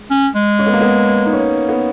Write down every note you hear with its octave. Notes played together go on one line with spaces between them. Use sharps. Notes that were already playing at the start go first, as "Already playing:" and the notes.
Already playing: G#3
C#4
G#3
C#4
B3
A#3
B3
D#4
C#4
B3